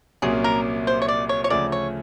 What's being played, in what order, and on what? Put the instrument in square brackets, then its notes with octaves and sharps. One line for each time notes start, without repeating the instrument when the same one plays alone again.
[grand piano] C2 A#2 F#3 A#3 C#4 [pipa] G#4
[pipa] A#4
C5
C#5
D5
C#5
C#5
[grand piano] D2 C#3 F3 A3 C#4 [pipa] D5
[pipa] C#5